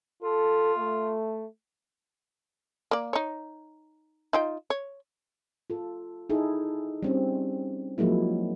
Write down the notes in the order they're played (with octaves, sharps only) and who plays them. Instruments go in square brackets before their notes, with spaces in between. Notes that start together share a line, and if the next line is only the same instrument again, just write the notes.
[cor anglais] F4 [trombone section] A4
[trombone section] A3
[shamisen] A#3 D5
D#4 C#5
D#4 F4 G5
C#5
[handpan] F4 A4
D#4 E4 G#4 A4
G3 C4 C#4
F3 F#3 G#3 A#3 E4